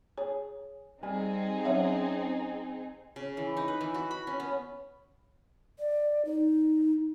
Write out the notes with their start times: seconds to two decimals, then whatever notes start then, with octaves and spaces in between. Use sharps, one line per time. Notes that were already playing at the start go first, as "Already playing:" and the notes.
0.18 G#4 C#5
1.03 G3 C4 D#4 G#4 G#5
1.65 F#3 C#4 D4 C#5 E5 F#5
3.16 C#3
3.37 E3
3.57 D#4
3.68 B4
3.81 E3
3.94 F#4
4.11 B5
4.27 C#4
4.40 B3
5.79 D5
6.25 D#4